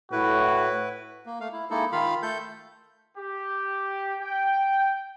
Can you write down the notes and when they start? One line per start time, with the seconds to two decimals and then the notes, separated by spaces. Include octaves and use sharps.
0.12 A2 E4 F#4 B4
1.26 A#3
1.41 A3 F5
1.52 E4
1.70 G#3 A#3 D#4 E4 A4
1.92 D#3 F4 F5 B5
2.23 A3 A4 G6
3.18 G4
4.20 G5